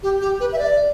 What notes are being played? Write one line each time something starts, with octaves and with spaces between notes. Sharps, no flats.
G4
G4
B4
E5
D5